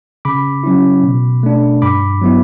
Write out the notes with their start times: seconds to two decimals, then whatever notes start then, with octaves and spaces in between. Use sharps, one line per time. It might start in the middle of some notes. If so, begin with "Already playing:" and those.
0.25 C#3 B5 D6
0.64 F#3 C#4 E4
1.04 B2
1.43 A3 D4
1.82 G2 B5 D6
2.22 F#3 B3 E4